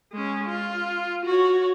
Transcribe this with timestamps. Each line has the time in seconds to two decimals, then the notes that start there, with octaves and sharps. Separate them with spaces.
0.13 G#3 C#4
0.48 F4
1.25 F#4 C#5